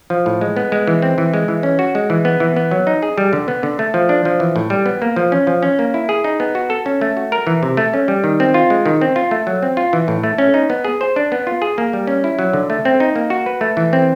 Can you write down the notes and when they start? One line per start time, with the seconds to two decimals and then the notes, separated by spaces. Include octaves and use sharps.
0.10 F3
0.26 A2
0.41 G#3
0.57 B3
0.72 G#3
0.87 E3
1.02 C4
1.18 E3
1.34 G#3
1.48 E3
1.63 C#4
1.79 F#4
1.95 G#3
2.10 E3
2.25 B3
2.40 E3
2.56 B3
2.71 F#3
2.87 D#4
3.02 G#4
3.18 G3
3.33 D3
3.48 B3
3.63 D3
3.79 A3
3.94 F3
4.09 D4
4.25 F3
4.40 E3
4.56 A2
4.70 G3
4.86 B3
5.02 A#3
5.16 F3
5.32 C#4
5.47 F3
5.63 C#4
5.79 A#3
5.94 E4
6.09 G#4
6.24 D#4
6.40 B3
6.55 F#4
6.70 A4
6.86 C#4
7.01 A3
7.17 F#4
7.32 A#4
7.47 E3
7.63 C3
7.77 A3
7.94 C#4
8.08 G3
8.24 D#3
8.40 C4
8.54 F4
8.70 G#3
8.86 D#3
9.01 C4
9.16 F4
9.31 A3
9.47 F#3
9.63 C4
9.77 F4
9.93 E3
10.08 A2
10.24 A3
10.38 C#4
10.54 D#4
10.70 B3
10.85 G#4
11.01 C5
11.16 D4
11.32 B3
11.47 F4
11.62 G#4
11.78 A#3
11.93 G3
12.07 C#4
12.24 E4
12.39 F#3
12.53 D3
12.70 A3
12.85 C4
13.00 D#4
13.16 A#3
13.30 F#4
13.46 B4
13.61 A3
13.77 E3
13.93 C4